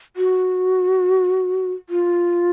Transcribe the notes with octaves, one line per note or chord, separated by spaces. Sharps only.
F#4
F4